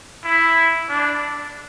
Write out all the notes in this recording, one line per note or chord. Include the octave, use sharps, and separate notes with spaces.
E4
D4